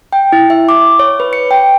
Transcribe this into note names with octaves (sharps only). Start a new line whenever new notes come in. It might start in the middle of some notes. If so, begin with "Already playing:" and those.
G5
E4
E5
D6
C#5
B4
C#7
G5